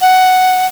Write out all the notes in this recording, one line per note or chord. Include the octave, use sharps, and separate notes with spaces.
F#5